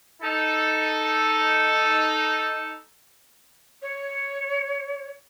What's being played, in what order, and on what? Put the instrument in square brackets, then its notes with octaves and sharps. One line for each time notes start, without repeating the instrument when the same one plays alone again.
[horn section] D#4 A4
[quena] C#5